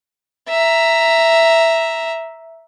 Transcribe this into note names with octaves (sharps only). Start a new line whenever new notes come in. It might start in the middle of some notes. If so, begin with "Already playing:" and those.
E5 A#5